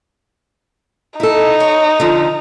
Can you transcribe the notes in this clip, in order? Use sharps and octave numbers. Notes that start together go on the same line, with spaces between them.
D#4 E4 A4
C#5
D3 F3